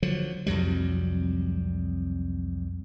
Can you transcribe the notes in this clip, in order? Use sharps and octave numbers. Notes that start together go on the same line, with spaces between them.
D3 F3 F#3
C2 F2 F#3 G3